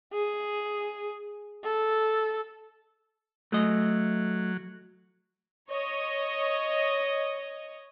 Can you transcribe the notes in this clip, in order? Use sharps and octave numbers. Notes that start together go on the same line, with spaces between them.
G#4
A4
F#3 A3 D#5
C#5 D#5